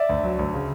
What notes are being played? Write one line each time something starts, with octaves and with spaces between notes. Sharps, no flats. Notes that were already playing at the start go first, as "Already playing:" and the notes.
Already playing: D5 E5
D2
F#3
D2
C#3